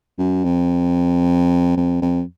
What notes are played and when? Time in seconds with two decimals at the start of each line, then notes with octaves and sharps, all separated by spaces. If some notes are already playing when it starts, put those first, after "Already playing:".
0.19 F#2
0.44 F2
1.77 F2
2.02 F2